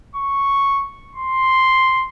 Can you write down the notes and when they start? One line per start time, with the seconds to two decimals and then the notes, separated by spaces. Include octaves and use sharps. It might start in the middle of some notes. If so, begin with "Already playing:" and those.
0.16 C#6
1.16 C6